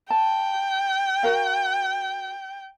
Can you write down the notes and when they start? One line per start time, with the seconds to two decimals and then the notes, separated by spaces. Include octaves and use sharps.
0.10 G5 A5
1.23 F#4 A#4 F5